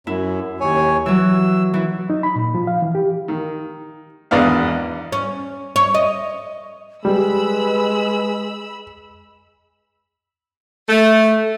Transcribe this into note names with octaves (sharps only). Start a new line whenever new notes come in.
F#2 E4
D#2 C#5 G#5
E3 F#3 E6
E3 E4
D#4
B5
A#2
F3
F5
E3
G4
D#3
G#1 E2 B3 D4 F5
C#4
C#5
D#5
G3 G#3 B4 B5 E6
A3